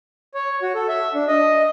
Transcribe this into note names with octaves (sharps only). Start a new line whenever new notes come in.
C#5
F#4
A4
E5
D4
D#5